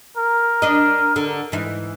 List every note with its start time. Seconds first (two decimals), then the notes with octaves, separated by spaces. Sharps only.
0.17 A#4
0.62 D4 D#5
1.16 D3
1.52 G#2 E3